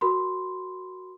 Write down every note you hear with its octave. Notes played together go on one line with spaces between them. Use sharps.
F#4 A#4 B5 C6